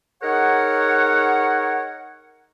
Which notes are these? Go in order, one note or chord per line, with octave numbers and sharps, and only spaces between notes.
D#4 G#4 A#4 C#5 F#5